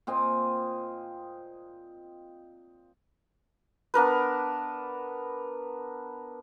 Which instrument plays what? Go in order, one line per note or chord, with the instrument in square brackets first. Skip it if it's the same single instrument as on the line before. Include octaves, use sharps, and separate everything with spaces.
[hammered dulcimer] A#2 C4 D#5 G#5
[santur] B3 D4 A#4 B4